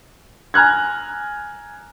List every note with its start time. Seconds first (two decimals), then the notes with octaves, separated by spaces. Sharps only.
0.54 G#5 A#5 F6 F#6 G#6